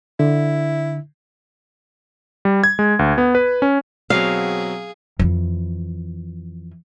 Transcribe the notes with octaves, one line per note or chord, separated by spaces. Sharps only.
D3 E4
G3
G#6
G#3
D2
B3
B4
C#4
B2 F#3 C4 G#4 F5
F2 E3